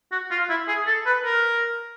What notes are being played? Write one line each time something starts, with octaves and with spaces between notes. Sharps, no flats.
F#4
F4
E4
G#4
A4
B4
A#4